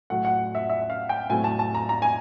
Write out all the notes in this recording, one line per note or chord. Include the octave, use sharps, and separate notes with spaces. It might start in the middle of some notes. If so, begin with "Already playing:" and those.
A2 F#3 A3 F#5
F#5
E5
E5
F5
G5
A2 F#3 A3 C4 G#5
A5
A5
A#5
A#5
G#5